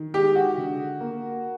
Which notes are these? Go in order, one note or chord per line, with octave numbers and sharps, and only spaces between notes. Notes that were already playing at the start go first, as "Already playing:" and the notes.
Already playing: D#3
G#3 G4
F#4
D3
A#3